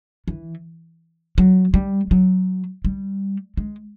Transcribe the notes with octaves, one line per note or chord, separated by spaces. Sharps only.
E3
F#3
G3
F#3
G3
G#3